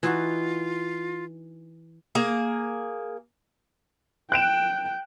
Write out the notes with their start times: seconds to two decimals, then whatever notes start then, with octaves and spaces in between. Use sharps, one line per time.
0.03 E3 D#4 F4 F#4
2.15 A#3 G#4
4.32 G5 F#6 D7 E7